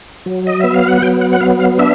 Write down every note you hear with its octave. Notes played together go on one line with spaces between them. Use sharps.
F#3
D#5
B3 E5
F5
F#5
F#3 G5
F#5
F#5
B3 F5
F5
D4 E5